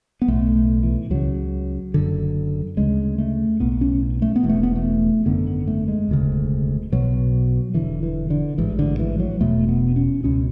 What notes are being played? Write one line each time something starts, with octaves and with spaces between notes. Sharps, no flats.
B3
B1 A2 A3
A3
E3
C#2 C#3 F#3
F#1 F#2 D3
D2 C#3 G#3
A3
B1 A2 B3
B3
C#4
A3
B3
E1 E2 B2
A3
B3
A3
G#1 F#2 D3 B3
B3
A3
G#3
E1 D2 C#3
B1 B2 F#3
E1 E2 D3 E3
E3
D3
A1 G#2 E3
D3
E3
F#3
E1 E2 B2 A3
B3
C#4
C#2 B2 C#4